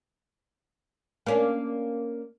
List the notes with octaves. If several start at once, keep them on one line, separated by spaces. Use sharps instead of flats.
A#3 C#4 D4